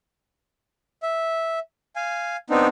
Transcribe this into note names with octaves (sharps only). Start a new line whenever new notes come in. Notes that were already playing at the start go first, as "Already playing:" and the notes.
E5
F5 G#5
B3 C4 D4 D#4